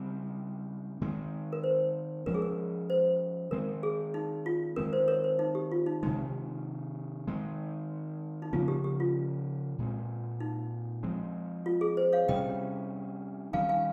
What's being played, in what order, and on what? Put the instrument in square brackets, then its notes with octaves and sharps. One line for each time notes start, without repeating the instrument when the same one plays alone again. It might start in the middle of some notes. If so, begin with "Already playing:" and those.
Already playing: [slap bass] C#3 G3 C4
D#3 G#3 C4
[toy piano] A#4
C5
[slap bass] F3 G#3 C#4 [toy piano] A#4
[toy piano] G#4
A#4
C5
[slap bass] D#3 G#3 C4 [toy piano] A#4
[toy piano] G#4
D#4
F4
[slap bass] D#3 G#3 C4 [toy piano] A#4
[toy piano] C5
A#4 C#5
C5
D#4
G4
F4
D#4
[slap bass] C3 D#3 G#3 [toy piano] D#4
[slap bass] D#3 G#3 C4
[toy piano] D#4
[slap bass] C#3 F3 A#3 C#4 [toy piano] F4
[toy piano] G4
G4
F4
[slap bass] A#2 G#3 C4
[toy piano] D#4
[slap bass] F3 G#3 C4
[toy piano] F4
G#4
C5
C#5 F5
[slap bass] C3 G3 C#4 [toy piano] D#5 G5
[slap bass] D#3 G3 C#4 [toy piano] F5 G#5
[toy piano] F5 G#5